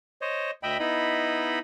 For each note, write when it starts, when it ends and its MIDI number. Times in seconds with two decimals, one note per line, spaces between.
0.22 0.51 72
0.22 0.51 73
0.22 0.51 75
0.63 0.78 38
0.63 0.78 75
0.63 0.78 76
0.63 0.78 79
0.63 0.78 83
0.80 1.59 59
0.80 1.59 63
0.80 1.59 64
0.80 1.59 75
0.80 1.59 83